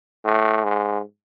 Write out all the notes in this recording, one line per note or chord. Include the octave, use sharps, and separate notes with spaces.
A2
G#2